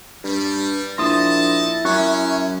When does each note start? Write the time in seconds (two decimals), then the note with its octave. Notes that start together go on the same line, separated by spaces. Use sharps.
0.24 G2 G3
0.98 A#1 D#4 E4 D#5 A5 C6 D#6
1.85 F#2 C#4 E5 C#6 F#6